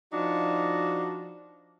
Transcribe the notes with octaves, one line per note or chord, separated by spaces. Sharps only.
F3 D4 D#4 F#4